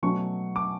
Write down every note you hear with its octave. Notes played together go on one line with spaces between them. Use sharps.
B2 F#3 A3 C#4 C#6
D6